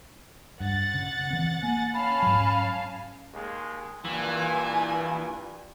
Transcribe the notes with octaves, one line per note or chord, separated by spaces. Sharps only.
G2 F#5 A6
C#3
E3 C4
A#3 G#5
C#4 F5 A5 B5
G#2 F#3
D#2 G#3
G2 A#2 E3 G#5